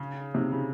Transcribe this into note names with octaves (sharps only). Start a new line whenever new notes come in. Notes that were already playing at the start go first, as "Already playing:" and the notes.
Already playing: C#3
C3
C#3